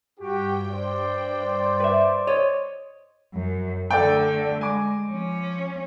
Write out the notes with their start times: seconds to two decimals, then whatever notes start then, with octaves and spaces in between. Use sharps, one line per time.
0.19 G2 F#4 G4 G5
0.71 C5 D5
1.80 B4 E5
2.27 C#5 D#5
3.34 F#2
3.91 D3 A3 A4 D5 G5
4.61 G#3 G#5 D6
5.09 F3 C#4